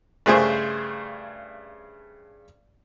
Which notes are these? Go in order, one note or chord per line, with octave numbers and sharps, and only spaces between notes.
G2 C#3 A3 G#4 C5